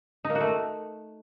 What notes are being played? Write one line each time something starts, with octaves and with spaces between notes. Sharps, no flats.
D#4
A#3
F#4
A3